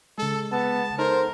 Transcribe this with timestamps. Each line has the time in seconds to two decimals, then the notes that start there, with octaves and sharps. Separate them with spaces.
0.18 C#3 G#3 A4
0.52 B3 A5
0.98 D#4 A4 A#4 C5